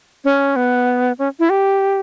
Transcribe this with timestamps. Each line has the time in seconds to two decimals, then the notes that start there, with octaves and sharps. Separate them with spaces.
0.25 C#4
0.56 B3
1.19 C#4
1.39 E4
1.50 G4